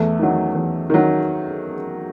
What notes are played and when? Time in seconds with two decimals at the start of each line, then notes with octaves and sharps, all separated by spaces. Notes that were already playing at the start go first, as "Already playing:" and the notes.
Already playing: E2 A3 A4
0.19 D#3 F#3
0.55 E2
0.90 D#3 F#3